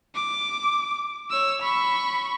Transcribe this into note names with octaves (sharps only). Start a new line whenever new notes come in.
D6
C#5 E6
B5 C#6